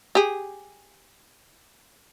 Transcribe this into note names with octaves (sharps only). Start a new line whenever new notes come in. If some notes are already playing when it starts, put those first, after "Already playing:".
G4 G#4